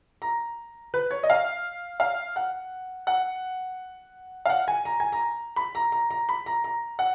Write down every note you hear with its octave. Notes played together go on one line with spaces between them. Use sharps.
A#5
B4
C#5
D#5
F5
F5
F#5
F#5
F5
F#5
G#5
A#5
G#5
A#5
B5
A#5
A#5
A#5
B5
A#5
A#5
F#5